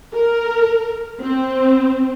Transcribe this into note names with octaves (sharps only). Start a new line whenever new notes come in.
A#4
C4